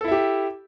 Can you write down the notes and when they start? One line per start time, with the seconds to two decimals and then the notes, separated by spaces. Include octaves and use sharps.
0.01 A4
0.04 E4
0.08 E5
0.11 G4